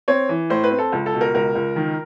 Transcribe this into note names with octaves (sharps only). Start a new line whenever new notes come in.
C4 C#5
E3
A2 C5
B4
C4
A4
C#2
A4
B2
A#4
C#2 A#4
C#2
D#3